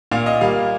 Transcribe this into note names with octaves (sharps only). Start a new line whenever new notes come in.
A#2 F5
D#5
G3 A#3 F5